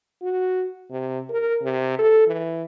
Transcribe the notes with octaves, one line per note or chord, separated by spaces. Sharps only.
F#4
C3
A#4
C3
A4
E3